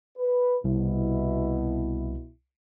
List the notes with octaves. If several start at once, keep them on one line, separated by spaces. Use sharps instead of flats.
B4
C2 B2 E4